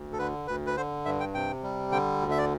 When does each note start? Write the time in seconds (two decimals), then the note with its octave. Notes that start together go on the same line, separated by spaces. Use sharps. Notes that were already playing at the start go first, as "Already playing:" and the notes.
Already playing: D2
0.13 A4
0.19 D3 B4
0.47 D2 B4
0.67 B4
0.77 D3 C5
1.05 G2 E5
1.20 G5
1.34 C3 G5
1.63 G3
1.92 D3 G5
2.21 D2
2.31 E5
2.38 D5